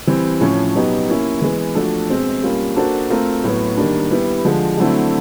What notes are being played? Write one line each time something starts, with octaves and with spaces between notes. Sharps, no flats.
E3 G3 C4
A2 F3 A3 C#4
B2 F#3 B3 D#4 G4
A#3 C#4 E4
E3 G#3 B3
F3 A3 D4 F#4 A4
B2 G#3 C4
G3 A#3 C#4 F4
A#3 D4 F#4 A4 C5
A3 C4 F4 A#4
A2 F#3 B3
D#3 G3 A#3 D4
G3 B3 E4 G4
D3 F3 G#3
D3 F#3 A3 C4 E4